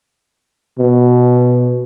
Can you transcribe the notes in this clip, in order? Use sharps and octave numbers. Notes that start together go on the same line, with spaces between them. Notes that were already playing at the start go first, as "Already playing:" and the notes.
B2